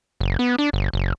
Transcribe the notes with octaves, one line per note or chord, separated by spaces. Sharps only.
F#1
B3
D4
G1
F#1